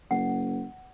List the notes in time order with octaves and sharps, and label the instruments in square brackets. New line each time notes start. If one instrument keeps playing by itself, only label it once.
[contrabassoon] F#1 [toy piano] F#5